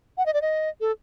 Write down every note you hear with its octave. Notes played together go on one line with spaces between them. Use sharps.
F#5
D#5
D5
D#5
A4